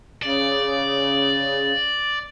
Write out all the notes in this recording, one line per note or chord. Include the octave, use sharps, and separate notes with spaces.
C#3 D5